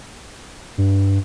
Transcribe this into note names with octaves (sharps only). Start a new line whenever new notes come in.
G2